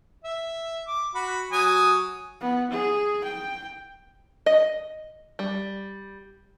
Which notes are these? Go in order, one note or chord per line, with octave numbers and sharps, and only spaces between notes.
E5
D6
F#4 B5
F#3 G#5 D#6
B3
G#4
G5
D#5
G3